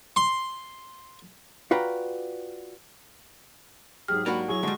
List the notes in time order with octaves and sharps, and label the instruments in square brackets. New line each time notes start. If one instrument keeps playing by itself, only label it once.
[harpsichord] C6
[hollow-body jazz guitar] F4 F#4 B4 D5 G5 A#5
[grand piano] G#2 F#3 G4 [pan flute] G#4 [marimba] F6
[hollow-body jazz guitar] A#3 D4 F#4 [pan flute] B5
[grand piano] F#3 E4 G#4 [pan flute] C#6
[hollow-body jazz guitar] D3 G3 [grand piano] G#3 F#4